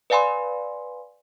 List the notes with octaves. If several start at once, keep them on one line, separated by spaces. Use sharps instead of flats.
B4 D5 F5 G#5 B5 C6